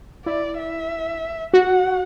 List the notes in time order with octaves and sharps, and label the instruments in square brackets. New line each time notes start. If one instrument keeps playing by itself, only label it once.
[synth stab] E4 [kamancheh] D5
[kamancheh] E5
[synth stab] F#4 [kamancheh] F#5